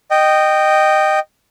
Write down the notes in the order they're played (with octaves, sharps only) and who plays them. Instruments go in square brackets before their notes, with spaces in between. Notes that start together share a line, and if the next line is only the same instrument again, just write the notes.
[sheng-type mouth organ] D#5 G5